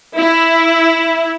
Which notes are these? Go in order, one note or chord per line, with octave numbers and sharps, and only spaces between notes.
E4